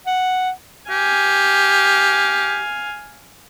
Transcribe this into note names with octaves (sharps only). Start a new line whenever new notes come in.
F#5
G4 F5 G#5